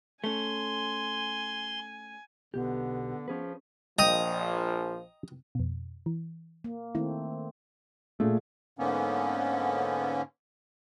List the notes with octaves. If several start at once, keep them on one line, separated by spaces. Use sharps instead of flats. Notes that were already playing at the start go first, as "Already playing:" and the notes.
A3 C#4 G#5 C6
B1 D3 B3 G4
F3 C#4 G#4 B4
A#1 F3 D#5 G5 A#5 D#6
F2 B2
E3
A#3
D#3 A3 C4 E4
A#2 A3 F4 G#4
G#2 D3 A#3 B3 C#4